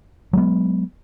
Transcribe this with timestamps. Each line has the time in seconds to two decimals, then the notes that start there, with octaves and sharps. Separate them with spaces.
0.33 F#3 G#3 B3